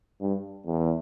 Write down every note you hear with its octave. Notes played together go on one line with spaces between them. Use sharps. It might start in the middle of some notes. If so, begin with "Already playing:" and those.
G2
E2